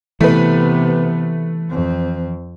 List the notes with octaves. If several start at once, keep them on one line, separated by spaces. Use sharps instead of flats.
C3 E3 A3 B3 B4
F2 C4